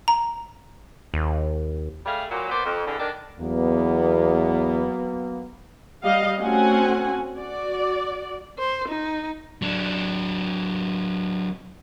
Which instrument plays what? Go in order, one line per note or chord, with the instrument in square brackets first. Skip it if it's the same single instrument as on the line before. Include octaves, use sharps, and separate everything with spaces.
[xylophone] A#5
[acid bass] D#2
[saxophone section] G3 A3 G#4 F5
A#2 F#3
A#3 B3 C5 D5
F2
E2 D3
D#3 D4
[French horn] E2 [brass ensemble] F#3 A#3 B3
[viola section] G3 D#5 F5
A3 C4 C#4 F#4 F#5 G#5
F#4 D5
[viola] C5
D#4
[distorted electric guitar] F#3 D4